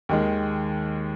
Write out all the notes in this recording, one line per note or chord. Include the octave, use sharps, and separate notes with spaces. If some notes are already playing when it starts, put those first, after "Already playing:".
D#2 D#3 G#3